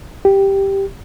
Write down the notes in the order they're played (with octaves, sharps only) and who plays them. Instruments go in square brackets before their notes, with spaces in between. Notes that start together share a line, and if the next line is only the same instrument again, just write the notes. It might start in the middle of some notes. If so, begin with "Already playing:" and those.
[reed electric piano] G4